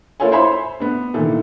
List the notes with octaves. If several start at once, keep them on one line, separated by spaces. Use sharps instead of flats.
A#3 E4 F4 A4 C#5 G#5
C5 C#5 E5 G#5 B5 C6
B3 D4
A#2 D#3 E3 A4